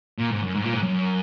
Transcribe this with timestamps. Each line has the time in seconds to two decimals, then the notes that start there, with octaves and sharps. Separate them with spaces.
0.18 A#2
0.31 G#2
0.42 F#2
0.54 G#2
0.64 A#2
0.73 G#2
0.82 F#2